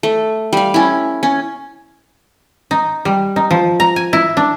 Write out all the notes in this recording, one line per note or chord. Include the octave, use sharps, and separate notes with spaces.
A3
G3 F5
C#4 E4
C#4
D#4
G3
D#4
F3
A#5
G#5
E4
D4